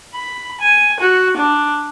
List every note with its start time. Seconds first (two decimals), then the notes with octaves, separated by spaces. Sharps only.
0.14 B5
0.61 G#5
1.00 F#4
1.37 D4